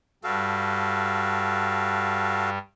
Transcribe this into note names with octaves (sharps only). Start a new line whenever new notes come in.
G2 G3 F#4 A4 F5